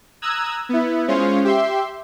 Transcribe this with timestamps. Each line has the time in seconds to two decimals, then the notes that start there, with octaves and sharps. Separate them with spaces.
0.22 A#5 D#6 E6 F#6 G#6
0.69 B3 E4
1.08 G#3 C#4 F4 C5 C#5
1.44 G4 E5 C6